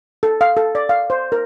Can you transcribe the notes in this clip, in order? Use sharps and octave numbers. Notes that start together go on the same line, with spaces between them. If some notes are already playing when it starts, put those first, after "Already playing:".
A4
F5
A4
D5
F5
C5
A#4